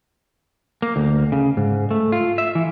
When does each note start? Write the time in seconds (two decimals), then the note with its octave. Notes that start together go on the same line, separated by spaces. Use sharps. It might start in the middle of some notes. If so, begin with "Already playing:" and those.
0.82 A#3
0.96 D2
1.32 C#3
1.57 G#2
1.91 A3
2.12 F4
2.38 E5
2.55 E3